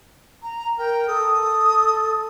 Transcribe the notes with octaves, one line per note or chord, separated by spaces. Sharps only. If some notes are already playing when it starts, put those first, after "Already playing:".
A#5
A#4 G5
A4 D#6